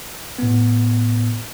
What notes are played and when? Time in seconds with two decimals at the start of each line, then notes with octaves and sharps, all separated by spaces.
0.39 A2 B3